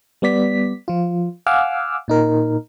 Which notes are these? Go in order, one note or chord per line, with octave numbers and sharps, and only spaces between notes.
G3 B3 D5 B6
F3 F4
F5 F#5 G#5 D6 E6 F6
A#2 D#4 A#4